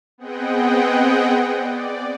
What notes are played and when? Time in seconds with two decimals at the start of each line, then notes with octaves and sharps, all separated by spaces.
0.18 B3 C4 G#4 D#5 F#5 G5
1.57 D5